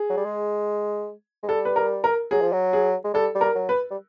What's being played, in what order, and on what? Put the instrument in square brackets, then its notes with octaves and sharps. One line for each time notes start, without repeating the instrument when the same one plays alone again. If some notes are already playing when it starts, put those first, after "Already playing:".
Already playing: [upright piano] G#4
[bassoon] F#3
G3
G#3
G#3
[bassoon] G3 [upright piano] A4
[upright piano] B4
A#4
A#4
[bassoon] F#3 [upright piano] G#4
[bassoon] F3
F#3
[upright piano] G#4
[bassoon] G#3
[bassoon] G3 [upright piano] A4
[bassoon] G3
[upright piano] A#4
[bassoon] F#3
[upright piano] B4
[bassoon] G3